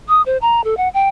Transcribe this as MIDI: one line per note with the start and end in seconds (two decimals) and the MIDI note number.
0.08 0.22 87
0.26 0.37 72
0.41 0.64 82
0.64 0.77 69
0.77 0.88 78
0.94 1.08 79